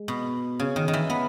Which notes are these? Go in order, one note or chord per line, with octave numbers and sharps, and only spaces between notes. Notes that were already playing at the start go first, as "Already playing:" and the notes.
Already playing: G#3
B2
C#3
D#3
D#3
E3
B3